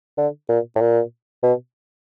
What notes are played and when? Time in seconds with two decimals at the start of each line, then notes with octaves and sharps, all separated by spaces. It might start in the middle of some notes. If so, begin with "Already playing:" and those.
0.18 D3
0.49 A#2
0.76 A2
0.81 A#2
1.43 B2